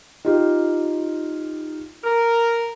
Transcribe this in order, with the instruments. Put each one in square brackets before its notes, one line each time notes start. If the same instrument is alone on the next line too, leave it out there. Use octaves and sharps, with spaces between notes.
[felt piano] D#4 F4 G4
[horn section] A#4